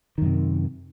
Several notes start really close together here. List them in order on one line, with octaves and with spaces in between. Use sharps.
D#3 F#2 C3